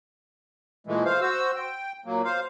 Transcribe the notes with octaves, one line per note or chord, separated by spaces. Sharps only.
A#2 E3 G#3 A3
C5 F5
F#4 C5 E6
G5
A#2 F#3 A#3
C5 F5